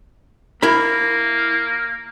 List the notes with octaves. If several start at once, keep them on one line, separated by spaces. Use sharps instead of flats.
A#3 E4 A#4 B5